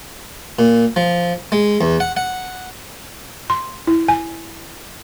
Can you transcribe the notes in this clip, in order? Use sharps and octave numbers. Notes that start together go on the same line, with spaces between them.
A#2
F3
G#3
E2
F#5
F#5
C6
E4
G#5